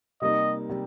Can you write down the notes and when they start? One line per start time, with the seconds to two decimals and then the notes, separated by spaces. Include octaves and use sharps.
0.22 C3 G3 A#3 D#4 D#5
0.69 C3 G3